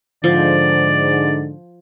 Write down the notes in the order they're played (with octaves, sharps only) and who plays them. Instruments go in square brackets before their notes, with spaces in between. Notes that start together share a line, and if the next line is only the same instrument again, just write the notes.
[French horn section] G#2 D3 [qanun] F3 [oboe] D5